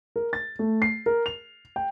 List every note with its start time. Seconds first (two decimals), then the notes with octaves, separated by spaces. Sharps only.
0.16 A#4
0.33 A6
0.59 A3
0.82 C7
1.06 A#4
1.26 F7
1.76 G5